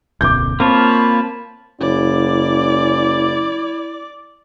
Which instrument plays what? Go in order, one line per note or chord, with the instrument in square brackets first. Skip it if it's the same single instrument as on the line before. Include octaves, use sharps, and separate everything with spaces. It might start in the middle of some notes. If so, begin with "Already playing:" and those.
[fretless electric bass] D1 B1 F#2 [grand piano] D6 G6
[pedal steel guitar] A#3 F4 C#5 [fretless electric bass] C4 [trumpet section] A5 B5
[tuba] F#1 [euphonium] C#4 [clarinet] E4 [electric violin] D5